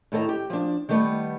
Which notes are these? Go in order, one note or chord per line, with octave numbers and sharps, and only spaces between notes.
A2 D#3 A4 F5 A#5
G4
F3 D4
D#3 G3 A3 B3